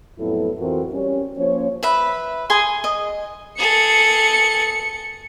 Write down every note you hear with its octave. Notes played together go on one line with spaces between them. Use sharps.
F2 A2 F#3 B3 E4 A4
F2 E3 F3 C4 F#4 A#4
G3 C#4
F3 A#3 C#4 C5 C#5
B4 E5 B5
G#4 G#5 C6
D#5
G#4 A4 C#7